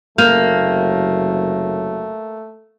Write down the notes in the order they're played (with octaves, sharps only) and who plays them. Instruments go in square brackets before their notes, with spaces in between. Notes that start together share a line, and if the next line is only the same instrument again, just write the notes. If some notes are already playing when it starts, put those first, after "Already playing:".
[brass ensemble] F#1 C3 F#3 [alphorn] A3 [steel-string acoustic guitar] A#3 [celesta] F6 G6 F7